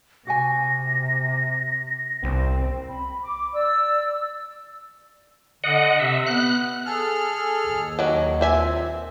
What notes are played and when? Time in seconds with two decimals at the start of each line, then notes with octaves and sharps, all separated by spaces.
0.27 C3 F#4 F#5 G#5 A#6
2.24 C2 C4
2.89 B5
3.23 D6
3.53 D5 E6
5.64 D3 D#5 F#5
5.99 C3 E5
6.27 B3 F#6
6.86 G#4 A4 F6
7.66 D#2
7.99 D#3 F#3 F#4
8.41 A#2 C4 E5 G#5